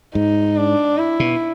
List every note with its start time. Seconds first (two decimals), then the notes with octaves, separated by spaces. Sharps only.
0.15 G#2 D#4
0.57 D4
0.98 E4
1.20 B2